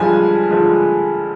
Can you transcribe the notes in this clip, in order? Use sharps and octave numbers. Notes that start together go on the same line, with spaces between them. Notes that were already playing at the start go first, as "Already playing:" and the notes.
Already playing: G2 D3 F3 G#3 G#5
D3 F3 G#3